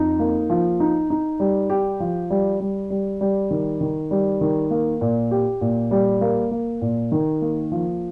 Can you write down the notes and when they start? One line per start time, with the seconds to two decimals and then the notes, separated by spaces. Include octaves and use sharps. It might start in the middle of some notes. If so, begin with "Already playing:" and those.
Already playing: F2 D#4
0.19 A#3
0.50 F3
0.80 D#4
1.10 D#4
1.40 G3
1.70 G4
2.00 F3
2.30 G3
2.60 G3
2.90 G3
3.21 G3
3.51 D#3
3.81 D#3
4.11 G3
4.41 D#3
4.71 A#3
5.01 A#2
5.31 G4
5.61 A#2
5.91 G3
6.21 A#3
6.51 A#3
6.81 A#2
7.12 D#3
7.41 A#3
7.72 F3